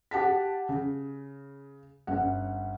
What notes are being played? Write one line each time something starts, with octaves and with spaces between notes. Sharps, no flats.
G4 F#5 A5 B6
C#3
G1 C#4 F#5